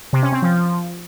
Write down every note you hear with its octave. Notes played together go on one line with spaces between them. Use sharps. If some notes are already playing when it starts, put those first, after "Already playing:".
C3
C#4
C4
F3